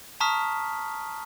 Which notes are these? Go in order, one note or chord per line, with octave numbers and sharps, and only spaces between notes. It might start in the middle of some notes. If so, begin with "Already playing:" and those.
A5 A#5 C#6 D#6 F6 B6